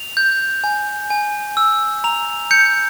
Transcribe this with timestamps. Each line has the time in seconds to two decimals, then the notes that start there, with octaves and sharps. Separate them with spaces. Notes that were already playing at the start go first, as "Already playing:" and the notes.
Already playing: F7
0.17 G6
0.64 G#5
1.10 G#5
1.57 E6
2.04 A#5 F7
2.51 G6 C#7